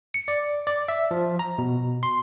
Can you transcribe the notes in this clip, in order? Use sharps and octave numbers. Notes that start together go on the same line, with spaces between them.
C#7
D5
D5
E5
F3
A#5
B2
C6